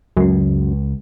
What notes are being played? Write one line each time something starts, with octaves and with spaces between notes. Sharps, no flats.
C#2 F#2 G#3